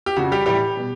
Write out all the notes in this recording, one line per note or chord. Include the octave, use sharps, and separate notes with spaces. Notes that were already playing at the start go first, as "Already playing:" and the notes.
G4
F2 C#3 F3 F#4
G3 G4
A2 E3 G3 G4
B2 G3